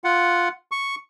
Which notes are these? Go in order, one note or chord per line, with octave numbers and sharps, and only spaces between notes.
F4 F#5
C#6